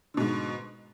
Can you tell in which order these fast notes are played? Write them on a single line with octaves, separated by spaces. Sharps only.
D3 B2 G#2